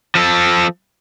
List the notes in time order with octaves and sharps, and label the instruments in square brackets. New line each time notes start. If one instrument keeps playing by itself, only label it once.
[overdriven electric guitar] F3 A4